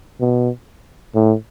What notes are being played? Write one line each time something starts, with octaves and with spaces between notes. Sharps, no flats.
B2
A2